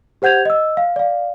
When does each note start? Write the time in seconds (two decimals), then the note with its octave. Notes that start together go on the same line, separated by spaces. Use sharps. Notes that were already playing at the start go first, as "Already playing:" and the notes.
0.22 G4 C5 F#5 G6 G#6 F7
0.45 D#5 E6
0.77 F5
0.96 D5 F5